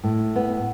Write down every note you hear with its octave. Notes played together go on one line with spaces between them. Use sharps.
A2
B3